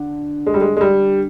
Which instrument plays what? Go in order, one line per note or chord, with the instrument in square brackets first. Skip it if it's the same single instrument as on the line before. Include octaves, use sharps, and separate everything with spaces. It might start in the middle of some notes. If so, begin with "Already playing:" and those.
Already playing: [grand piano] D3
[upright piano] G#3
G3
G#3
G#3
G3